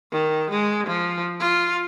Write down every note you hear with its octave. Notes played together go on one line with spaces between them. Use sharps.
D#3
G#3
F3
F4